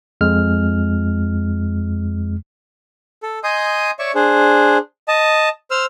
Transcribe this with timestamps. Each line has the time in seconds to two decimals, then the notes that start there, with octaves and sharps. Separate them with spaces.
0.21 F2 G#3 F6
3.23 A4
3.44 D#5 G#5 C6 D#6 G6
3.99 C#5 D5 E5 C#6
4.15 D4 G#4 C5
5.08 D#5 A5
5.71 C5 E6 F6